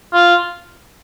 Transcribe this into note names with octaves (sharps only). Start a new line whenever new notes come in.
F4